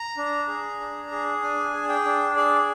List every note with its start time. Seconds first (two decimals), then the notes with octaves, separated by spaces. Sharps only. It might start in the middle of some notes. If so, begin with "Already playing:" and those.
Already playing: A#5
0.17 D4
0.48 G#4
0.80 D4
1.11 G#4
1.42 D4 G#5
1.73 G#4
1.89 G5
2.05 D4
2.36 G#4 D5